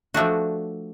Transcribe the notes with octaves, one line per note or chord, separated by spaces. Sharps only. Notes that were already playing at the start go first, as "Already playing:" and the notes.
F3 A3 D4 F#4